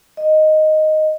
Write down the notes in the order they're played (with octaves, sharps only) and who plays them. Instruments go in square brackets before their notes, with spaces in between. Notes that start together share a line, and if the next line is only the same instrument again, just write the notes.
[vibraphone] D#5